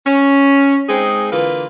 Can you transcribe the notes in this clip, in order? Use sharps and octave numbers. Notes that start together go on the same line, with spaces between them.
C#4
G#3 C4 D#4 G#4
D3 E3 A#3 F4 B4